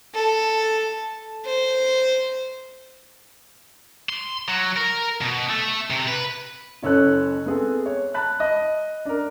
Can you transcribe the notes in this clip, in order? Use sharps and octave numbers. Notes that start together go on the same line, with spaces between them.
A4
C5
C6
F#3
A#4
B2
A3
C3
B4
F#1 C#4 A4 C#5 F#6
B3 C4 G#4 A4
C#5
A5 B5 F#6
D#5
D4 A#4